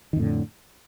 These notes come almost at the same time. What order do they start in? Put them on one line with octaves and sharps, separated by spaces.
D#3 F2 A2 D3